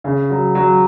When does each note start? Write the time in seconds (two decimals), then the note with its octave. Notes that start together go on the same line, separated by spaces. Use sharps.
0.04 C#3
0.30 F#3
0.55 F#3